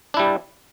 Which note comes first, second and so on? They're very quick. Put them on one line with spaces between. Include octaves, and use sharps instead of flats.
D4 E4 G3